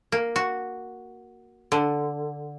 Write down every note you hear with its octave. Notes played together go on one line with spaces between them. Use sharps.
A#3
F#4
D3